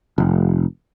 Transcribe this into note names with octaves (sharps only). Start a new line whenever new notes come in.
F1